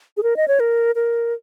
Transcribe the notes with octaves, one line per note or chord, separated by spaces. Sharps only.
G#4
A#4
D#5
C#5
A#4
A#4